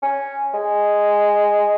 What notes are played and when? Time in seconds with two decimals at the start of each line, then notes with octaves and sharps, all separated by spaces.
0.02 C#4
0.54 G#3